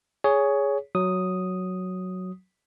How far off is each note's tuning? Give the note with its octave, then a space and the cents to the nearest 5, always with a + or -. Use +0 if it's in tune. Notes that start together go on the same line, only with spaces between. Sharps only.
G#4 +0 C#5 +15
F#3 +0 D#6 +0